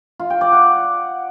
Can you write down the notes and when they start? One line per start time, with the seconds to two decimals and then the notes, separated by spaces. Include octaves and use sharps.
0.19 F4
0.30 G5
0.41 D5
0.52 F#5